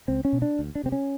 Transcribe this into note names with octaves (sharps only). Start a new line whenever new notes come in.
C#2 C4
C#4
B2
D4
D2
D4
C3 C4
C#4